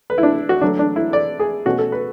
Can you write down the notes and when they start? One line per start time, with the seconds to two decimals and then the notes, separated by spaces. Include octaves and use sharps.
0.10 B4
0.18 E4
0.23 D4
0.49 F#4
0.61 D3 F#3 A3 D4
0.79 D4
0.96 E4
1.13 D5
1.40 G#4
1.65 B2 A3 C#4 F#4
1.79 A4
1.92 B4